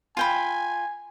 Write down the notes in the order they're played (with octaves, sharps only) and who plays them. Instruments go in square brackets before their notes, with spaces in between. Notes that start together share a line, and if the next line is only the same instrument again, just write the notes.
[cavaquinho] F4 G5 B5 [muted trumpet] G#5